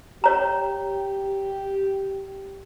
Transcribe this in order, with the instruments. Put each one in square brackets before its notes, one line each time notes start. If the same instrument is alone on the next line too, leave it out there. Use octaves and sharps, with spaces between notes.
[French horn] G4 [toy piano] C#5 A#5